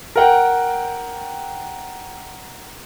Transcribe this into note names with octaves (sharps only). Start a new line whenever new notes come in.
A#4 F#5 G5